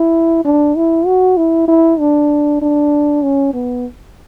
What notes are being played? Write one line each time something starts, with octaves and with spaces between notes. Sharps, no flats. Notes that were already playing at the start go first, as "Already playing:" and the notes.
Already playing: E4
D4
E4
F#4
E4
E4
D4
D4
C#4
B3